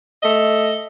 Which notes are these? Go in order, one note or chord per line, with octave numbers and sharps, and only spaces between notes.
A3 D#5